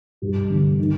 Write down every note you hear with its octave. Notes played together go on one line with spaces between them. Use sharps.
G2
D3
D#3